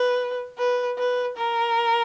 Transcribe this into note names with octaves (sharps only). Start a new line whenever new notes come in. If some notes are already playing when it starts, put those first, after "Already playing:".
Already playing: B4
B4
B4
A#4